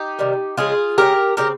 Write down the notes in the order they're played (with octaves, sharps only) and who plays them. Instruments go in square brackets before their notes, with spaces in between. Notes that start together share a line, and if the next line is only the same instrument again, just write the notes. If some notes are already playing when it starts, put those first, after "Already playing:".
Already playing: [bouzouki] D#4 G4
C3 D#3 G3
C#3 F3 G#3 F4 G#4
C#3 F3 G#3 G4 A#4
C#3 G#3 C4 G4 A#4